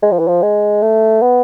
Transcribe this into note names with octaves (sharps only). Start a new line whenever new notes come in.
G#3
F3
E3
F3
G#3
A3
B3